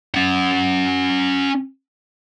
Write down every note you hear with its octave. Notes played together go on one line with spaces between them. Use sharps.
C#4 F#5